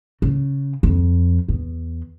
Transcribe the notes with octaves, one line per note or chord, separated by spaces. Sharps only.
C#3
F2
E2